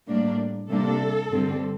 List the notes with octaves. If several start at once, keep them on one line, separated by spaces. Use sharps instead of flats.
A2 G3 A#3 D4
C3 G3 A#3 D4 A4
G2 D3 G3 C4